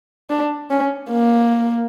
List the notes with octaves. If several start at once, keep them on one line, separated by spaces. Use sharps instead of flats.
D4
C#4
A#3